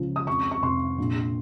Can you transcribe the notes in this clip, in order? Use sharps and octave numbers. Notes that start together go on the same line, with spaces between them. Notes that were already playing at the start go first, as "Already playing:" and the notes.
Already playing: C#2 C#3 F3
D#6
F2 C#6
C#6
F1 C6
A#1